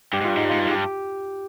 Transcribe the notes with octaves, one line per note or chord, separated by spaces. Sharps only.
G2 G4
G#2
G2 F4
G#2 D#4
G2
G#2 F4
G2
G#2
G2 G4